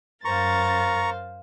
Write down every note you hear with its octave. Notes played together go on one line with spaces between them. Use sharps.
F#2 A#4 C5 F5 A#5 C#6 A6